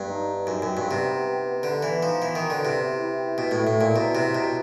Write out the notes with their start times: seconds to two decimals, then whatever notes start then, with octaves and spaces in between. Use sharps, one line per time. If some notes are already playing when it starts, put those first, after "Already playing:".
Already playing: G2 B3
0.09 D#4
0.29 D#4
0.47 F#2 D#4
0.62 F#2 G4
0.77 G2
0.86 C3 B3
1.06 B3
1.25 G4
1.45 B3
1.63 D3 B3
1.83 E3 B3
2.02 F3 D#4
2.22 E3 B3
2.35 D#3
2.41 F#3
2.50 D3
2.60 E4
2.65 C3
2.80 B3
2.99 E4
3.18 G4
3.38 B2 G4
3.51 A2
3.57 E4
3.67 A2
3.75 G4
3.81 A#2
3.96 B2 F#3
4.15 C3 B3
4.35 B2 F#3